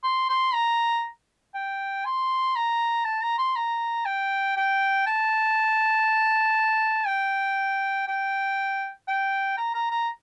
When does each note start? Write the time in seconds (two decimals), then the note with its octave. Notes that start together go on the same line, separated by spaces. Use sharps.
0.04 C6
0.29 C6
0.54 A#5
1.54 G5
2.05 C6
2.56 A#5
3.05 A5
3.22 A#5
3.38 C6
3.56 A#5
4.05 G5
4.57 G5
5.07 A5
7.07 G5
8.08 G5
9.08 G5
9.58 A#5
9.74 A#5
9.91 A#5